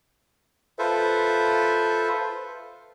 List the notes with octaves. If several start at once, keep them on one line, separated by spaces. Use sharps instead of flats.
F4 A4 B4 C5 E5